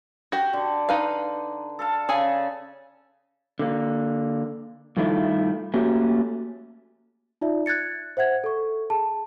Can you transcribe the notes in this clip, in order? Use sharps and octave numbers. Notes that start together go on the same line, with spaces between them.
F#4 G4
D3
D#4 B4 F5
A4 F5 A5
C#3 G#4 A4 G#5
D3 A#3
G2 D#3 A3 E4 F4
A3 A#3 C#4 F#4 G4
D#4 F4 D5 E5
F#6 G#6 A6 C#7
C5 E5 F#5 G#6
A4 C#6
G#4 A5